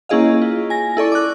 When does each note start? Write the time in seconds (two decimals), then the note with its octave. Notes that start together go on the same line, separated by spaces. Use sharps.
0.09 A#3 C#4 E4 G#4 D#5 F5
0.42 F4
0.70 G#5 A#6
0.97 E4 A4 D5 C#6
1.12 D6 F#6